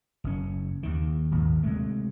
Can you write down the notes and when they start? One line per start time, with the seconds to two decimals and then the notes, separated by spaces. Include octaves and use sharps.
0.24 F#1 C#4
0.83 D#2 D#3
1.31 D#1 G#1 D#2
1.63 C3 G#3 A3